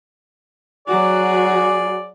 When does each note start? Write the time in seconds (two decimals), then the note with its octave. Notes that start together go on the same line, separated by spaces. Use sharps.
0.88 F#3 F#4 G#4 D5